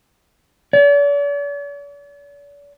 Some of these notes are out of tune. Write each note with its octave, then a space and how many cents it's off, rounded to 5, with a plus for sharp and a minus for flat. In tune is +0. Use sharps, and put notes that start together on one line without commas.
D5 -45